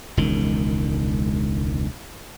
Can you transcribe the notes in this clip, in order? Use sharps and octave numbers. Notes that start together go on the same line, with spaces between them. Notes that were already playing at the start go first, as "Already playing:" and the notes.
E1 C#2 D#3